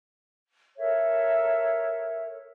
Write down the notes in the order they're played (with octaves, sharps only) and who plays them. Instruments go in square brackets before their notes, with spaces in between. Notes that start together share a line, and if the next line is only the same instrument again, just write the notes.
[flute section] A4 A#4 C#5 E5